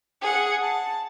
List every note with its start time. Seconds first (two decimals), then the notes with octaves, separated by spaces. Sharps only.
0.22 G#4 F#5
0.61 A5